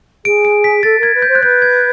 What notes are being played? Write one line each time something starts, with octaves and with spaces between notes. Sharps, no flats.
G#4 D7
D7
B6
A4 A6
A#4 G#6
B4
G6
C5
F#6
B4 G6
G#6